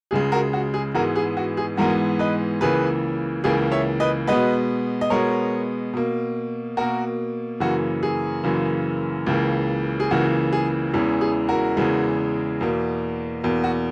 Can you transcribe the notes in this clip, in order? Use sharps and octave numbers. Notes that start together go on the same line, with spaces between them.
C#2 C#3 G#3 G#4
F#4 A#4
F#4
G#4
G#2 E3 G#3 B3 F#4 A#4
G#4
F#4
G#4
G#2 E3 G#3 B3 F#4 A#4
B4 D#5
C#2 C#3 E3 A#3 G#4 B4
C#2 C#3 E3 A#3 G#4
C#5 E5
B4 D#5
B2 G#3 B3 B4 D#5
D#5
B2 G#3 B3 A#4 C#5
B2 A#3
B2 A#3 F#4 A#4
F#2 C#3 E3 A#3 F#4
G#4
F#2 C#3 E3 A#3
C#2 C#3 E3 A#3
G#4
C#2 C#3 E3 A#3 F#4
G#4
E2 C#3 E3 G#3
G#4
F#4 A#4
E2 C#3 E3 G#3
E2 B2 A#3
E2 B2 A#3
F#4